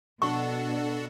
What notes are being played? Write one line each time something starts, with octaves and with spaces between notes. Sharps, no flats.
B2 D4 F#4 A4 F#5 C#6